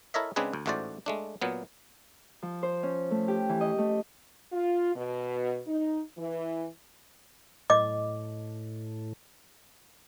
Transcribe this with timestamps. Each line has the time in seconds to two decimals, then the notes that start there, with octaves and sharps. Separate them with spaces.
0.14 E4 A4 A#4 C#5 D#5 E5
0.36 C#3 G#3 C4 D4 G#4 B4
0.53 D2
0.66 A1 G#2 A3 F#4 C5 D5
1.06 G#3 A3 D4
1.42 A#2 F#3 B3
2.42 F3
2.63 C5
2.83 C#4
3.11 A3
3.28 G4
3.49 E3
3.61 D#5
3.78 A3
4.52 F4
4.95 B2
5.67 D#4
6.18 E3
7.70 A2 D#5 D6